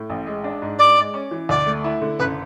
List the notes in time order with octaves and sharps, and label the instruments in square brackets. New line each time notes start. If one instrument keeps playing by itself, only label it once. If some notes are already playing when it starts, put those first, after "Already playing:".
Already playing: [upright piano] A2
A1
G#3
D4
G#2
[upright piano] G#2 [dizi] D5
[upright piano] G#3
C#4
E3
[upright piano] D2 [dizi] D5
[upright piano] A3
E4
D3
[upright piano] F#1 [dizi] B4